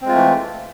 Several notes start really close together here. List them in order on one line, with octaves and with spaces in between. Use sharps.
C4 G#3 F4 A3 E3